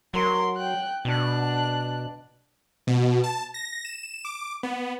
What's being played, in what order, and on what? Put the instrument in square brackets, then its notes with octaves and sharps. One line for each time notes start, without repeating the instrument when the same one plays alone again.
[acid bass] F#3 [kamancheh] A#4 C6
[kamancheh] G5 F#6
[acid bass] B2 [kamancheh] D4 F#6
[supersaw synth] B2
A5
A#6
E7
D6
B3